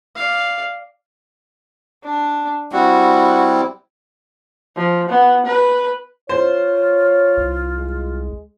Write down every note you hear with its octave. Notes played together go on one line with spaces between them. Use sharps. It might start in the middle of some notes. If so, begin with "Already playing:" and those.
D5 F5
D4
G3 C4 E4 F#4
F3
B3
B4
F4 C5 C#5
C2
G#3